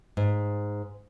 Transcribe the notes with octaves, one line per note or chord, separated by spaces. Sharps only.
G#2